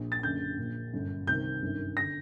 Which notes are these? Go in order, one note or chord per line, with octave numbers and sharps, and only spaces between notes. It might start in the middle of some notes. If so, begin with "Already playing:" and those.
Already playing: A#1
A6
F#1 F#2 D3 G6
A#1 A#2
G1 F#2 D3
C2 C3 D#3 G6
G1 F#2 D#3
D3 A#6